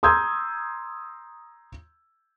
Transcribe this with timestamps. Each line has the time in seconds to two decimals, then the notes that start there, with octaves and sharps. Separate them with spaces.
0.03 A#5 C6 D#6 E6 G6 G#6